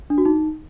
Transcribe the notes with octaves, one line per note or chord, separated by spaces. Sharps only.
D4
F#4
D#4